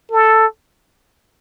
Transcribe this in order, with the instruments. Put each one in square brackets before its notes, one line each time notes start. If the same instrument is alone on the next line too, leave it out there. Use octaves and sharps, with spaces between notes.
[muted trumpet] A4